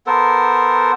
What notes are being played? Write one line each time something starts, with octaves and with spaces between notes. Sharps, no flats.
B3 A4 A#4 C5